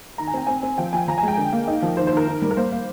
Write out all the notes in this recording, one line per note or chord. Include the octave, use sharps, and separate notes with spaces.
D#3 A#5
G#5
C4 G5
C4 G#5
C4
F3 G5
F3 G#5
F3 A#5
G#5
G#3 G5
D3
A#3
D#4
F3
D#3 C5
C5
D#3 A#4
D#3
G3
A#4
A#3 C5
A#3